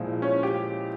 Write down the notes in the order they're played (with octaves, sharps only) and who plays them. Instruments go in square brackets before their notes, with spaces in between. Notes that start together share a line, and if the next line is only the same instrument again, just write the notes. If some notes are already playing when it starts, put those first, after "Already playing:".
Already playing: [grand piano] A#2 F3 G#3 E4
[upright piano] C#4
G4